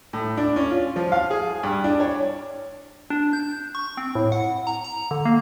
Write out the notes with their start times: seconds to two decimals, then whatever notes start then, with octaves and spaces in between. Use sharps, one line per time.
0.13 A2
0.38 D4
0.56 C#4
0.70 F4
0.96 F3
1.12 F5
1.30 G#4
1.63 G2
1.84 D4
2.00 C#5
3.10 D4
3.33 G6
3.75 C#6
3.97 C4
4.15 A2
4.32 F#5
4.67 A#5
4.84 A#5
5.11 D3
5.25 A#3